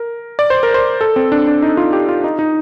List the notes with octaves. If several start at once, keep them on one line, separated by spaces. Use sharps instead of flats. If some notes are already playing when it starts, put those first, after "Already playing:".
Already playing: A#4
D5
C5
A#4
C5
A4
C4
D4
D4
D#4
F4
G4
F4
D#4
D#4